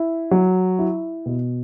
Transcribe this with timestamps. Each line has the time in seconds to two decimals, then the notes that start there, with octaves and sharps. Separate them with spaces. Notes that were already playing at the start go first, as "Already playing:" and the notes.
Already playing: E4
0.31 F#3
0.79 E4
1.26 B2